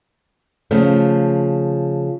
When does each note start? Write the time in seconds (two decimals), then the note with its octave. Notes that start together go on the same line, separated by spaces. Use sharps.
0.71 C#3 F3 A3